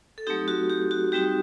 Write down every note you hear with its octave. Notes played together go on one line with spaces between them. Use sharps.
A4
F#3 A3 C4 D#4 G4
F#4
G4
F#4
G3 C4 D#4 F#4 G4